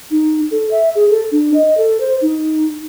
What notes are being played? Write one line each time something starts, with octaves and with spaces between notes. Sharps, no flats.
D#4
A4
E5
G#4
A4
D4
D#5
A4
C5
D#4